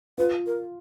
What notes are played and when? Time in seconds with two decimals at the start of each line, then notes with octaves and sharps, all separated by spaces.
0.18 F4 B4
0.46 A#4